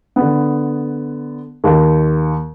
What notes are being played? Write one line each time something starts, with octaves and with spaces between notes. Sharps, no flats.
D3 B3
D#2